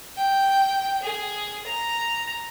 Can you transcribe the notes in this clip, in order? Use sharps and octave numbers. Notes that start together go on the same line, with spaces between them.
G5
G#4
A#5